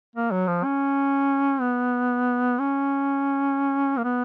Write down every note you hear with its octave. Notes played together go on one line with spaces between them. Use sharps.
A#3
F#3
F3
C#4
B3
C#4
A#3
B3